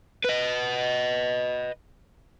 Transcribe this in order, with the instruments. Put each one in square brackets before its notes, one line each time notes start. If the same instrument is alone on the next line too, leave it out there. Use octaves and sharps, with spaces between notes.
[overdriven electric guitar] B4 D#5